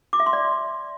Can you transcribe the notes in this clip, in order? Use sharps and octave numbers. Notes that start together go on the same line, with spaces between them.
D6
E5
C6
D5